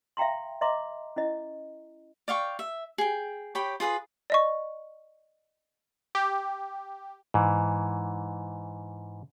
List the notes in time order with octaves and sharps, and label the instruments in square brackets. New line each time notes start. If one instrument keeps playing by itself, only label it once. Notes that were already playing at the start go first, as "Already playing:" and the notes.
[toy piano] E5 F5 G5 A#5 C6
D#5 E5 A#5 C6 D6
C#4 E4 D#5
[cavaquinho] D5 F5 G5 C#6
E5
G#4 G5
G4 C#5 G5 B5
F4 G#4 B4 D#6
[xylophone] D5 D#5 C#6
[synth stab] G4
[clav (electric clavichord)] G#2 E3